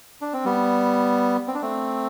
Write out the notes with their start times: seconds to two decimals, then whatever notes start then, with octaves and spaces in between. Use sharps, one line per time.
0.21 D4
0.33 C4
0.45 G3 B3
1.48 C4
1.55 D4
1.62 A3 C4